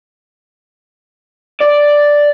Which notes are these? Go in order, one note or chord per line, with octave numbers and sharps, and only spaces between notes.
D5